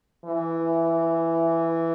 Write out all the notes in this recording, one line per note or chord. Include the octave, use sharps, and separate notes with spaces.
E3